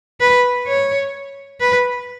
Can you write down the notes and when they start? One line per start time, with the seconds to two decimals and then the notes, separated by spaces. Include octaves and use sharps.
0.20 B4
0.67 C#5
1.60 B4